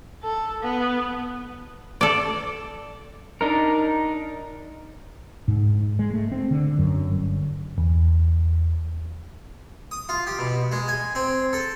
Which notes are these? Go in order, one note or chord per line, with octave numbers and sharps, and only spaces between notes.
A4
B3
A4 D5
D4 D#4 A#4
G#2
G#3
A3
C4
D3
F#2
G1
E2
D#6
F4
G4
B2
G#3
G#5
C4
A4